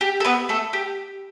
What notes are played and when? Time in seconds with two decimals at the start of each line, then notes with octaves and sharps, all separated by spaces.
0.01 G4
0.20 A4
0.25 B3 B4
0.49 A3 A4
0.73 G4